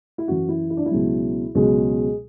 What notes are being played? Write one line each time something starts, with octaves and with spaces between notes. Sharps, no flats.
E4
F#2 E3 F#4
E4
E4
D4
E4
C#2 B2 F#3
C#2 B2 F#3 G#3